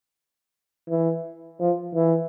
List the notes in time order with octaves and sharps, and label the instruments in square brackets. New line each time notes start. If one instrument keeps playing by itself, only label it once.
[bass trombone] E3
F3
E3